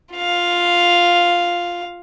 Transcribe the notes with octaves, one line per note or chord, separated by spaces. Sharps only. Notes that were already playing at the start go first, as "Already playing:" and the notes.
F4 F5